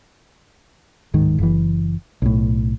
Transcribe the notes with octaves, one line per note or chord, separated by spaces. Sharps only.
D1 G#2 D#3
F#1 E3
B1 A2